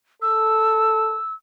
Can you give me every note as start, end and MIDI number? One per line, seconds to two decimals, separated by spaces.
0.22 1.18 69
0.22 1.33 88